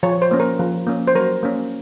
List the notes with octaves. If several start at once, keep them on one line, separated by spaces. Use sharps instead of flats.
F3 C#5
C5
A#3 C#4
A#4
F3
A#3 C#4
C5
F#3 A#4
A#3 C#4